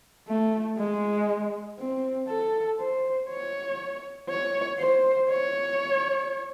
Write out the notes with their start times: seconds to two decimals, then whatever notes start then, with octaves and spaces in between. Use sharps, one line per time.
0.28 A3
0.78 G#3
1.79 C4
2.29 A4
2.79 C5
3.30 C#5
4.30 C#5
4.80 C5
5.30 C#5